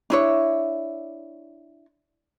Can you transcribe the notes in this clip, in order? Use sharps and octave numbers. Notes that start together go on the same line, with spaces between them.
D4 E4 C#5